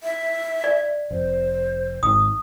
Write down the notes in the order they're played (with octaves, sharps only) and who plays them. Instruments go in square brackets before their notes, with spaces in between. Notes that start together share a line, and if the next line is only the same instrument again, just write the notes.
[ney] E5
[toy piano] D5
[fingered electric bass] F1 [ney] C5
[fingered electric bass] G#1 [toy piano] D#6